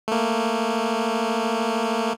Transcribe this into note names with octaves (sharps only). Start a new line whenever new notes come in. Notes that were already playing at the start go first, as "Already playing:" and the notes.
A3 A#3